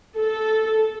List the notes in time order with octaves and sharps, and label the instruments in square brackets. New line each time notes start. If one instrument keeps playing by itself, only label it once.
[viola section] A4